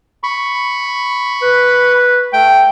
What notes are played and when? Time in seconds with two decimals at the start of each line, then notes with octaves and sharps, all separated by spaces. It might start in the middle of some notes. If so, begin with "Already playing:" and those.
0.23 B5 C#6
1.42 B4
2.33 A3 G5